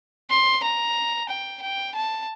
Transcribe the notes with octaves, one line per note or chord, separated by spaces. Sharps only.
C6
A#5
G5
G5
A5